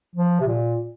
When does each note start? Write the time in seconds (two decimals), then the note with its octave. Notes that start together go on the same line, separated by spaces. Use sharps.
0.16 F3
0.41 C3
0.47 A#2